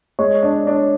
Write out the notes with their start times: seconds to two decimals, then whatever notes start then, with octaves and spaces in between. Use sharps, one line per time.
0.19 G#3 C#5
0.43 D4
0.67 D4